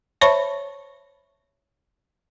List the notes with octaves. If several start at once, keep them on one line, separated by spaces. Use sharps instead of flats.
C5 C#5 E5 A5 B5 C#6